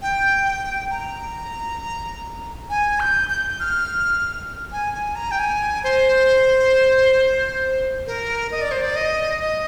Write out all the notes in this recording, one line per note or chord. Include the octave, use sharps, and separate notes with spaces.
G5
A#5
G#5
G6
G6
F6
G#5
G#5
A#5
G5
G#5
C5
A#4
D#5
D5
C5
D5
D#5
D#5